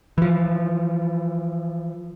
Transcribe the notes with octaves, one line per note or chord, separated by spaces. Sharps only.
E3 F3